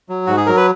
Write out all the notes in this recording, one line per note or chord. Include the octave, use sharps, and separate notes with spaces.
F#3
G#2 F#4
G#4
F#3 A#4
B4